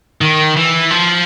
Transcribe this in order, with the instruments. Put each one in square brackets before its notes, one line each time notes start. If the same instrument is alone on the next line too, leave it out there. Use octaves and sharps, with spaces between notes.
[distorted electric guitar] D#3
E3
F3